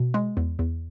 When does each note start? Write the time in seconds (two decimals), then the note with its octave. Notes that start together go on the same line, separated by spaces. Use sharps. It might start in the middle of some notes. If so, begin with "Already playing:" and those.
Already playing: B2
0.14 G#3
0.37 E2
0.59 E2